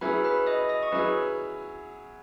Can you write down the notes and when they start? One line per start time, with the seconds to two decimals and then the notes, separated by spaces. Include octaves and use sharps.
0.01 F#3 C#4 E4 G#4 B4 B5
0.24 B4 B5
0.46 D#5 D#6
0.69 D#5 D#6
0.83 C#6
0.92 F#3 C#4 E4 G#4 B4 B5